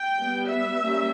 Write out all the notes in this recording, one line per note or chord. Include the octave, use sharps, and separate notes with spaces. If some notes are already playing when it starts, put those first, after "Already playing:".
Already playing: G5
G3 B3
E5
G3 A#3 C#4